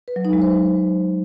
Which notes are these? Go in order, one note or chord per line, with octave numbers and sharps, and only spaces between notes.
B4
F#3
D#4
G#3
C5